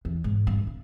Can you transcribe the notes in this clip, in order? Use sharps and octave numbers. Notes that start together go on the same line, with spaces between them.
E2
G#2
G2
D3